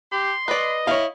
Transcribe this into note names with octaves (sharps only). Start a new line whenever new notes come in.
G4 C6
B4 D5 D#5
E4 C#5 F5